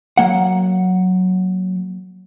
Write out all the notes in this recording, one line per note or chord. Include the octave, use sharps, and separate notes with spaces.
F#3 A#3 F#5